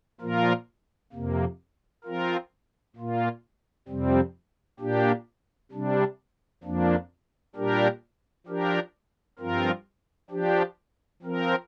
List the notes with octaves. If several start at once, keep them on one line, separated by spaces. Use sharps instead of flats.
A#2 F3 A#3 F4 A#4
F2 C3 A#3
F3 C4 F4 A#4
A#2 A#3 F4
F2 C3 G3 C4
A#2 A#3 D4 G4
C3 G3 D4
F2 F3 A#3 D4
A#2 G3 D4 G4 A#4
F3 D4 G4 A#4
G2 F3 C4 F4 A#4
F3 D4 G4
F3 C4 A#4